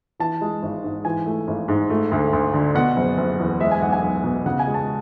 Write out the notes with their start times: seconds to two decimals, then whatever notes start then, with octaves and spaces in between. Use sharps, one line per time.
0.20 E3 A5
0.41 G#3
0.63 G#1
0.84 G#2
1.05 E3 G#5
1.26 A3
1.48 G#1
1.68 G#2
1.90 A3
2.12 D2
2.33 D2
2.54 D3
2.75 B2 F#5
2.96 F#1
3.18 F#1
3.39 E2
3.60 G#3 E5
3.71 G#5
3.82 B1 F#5
3.92 G#5
4.03 B1
4.24 B2
4.46 C#3 F#5
4.59 G#5
4.67 G#3
4.74 A5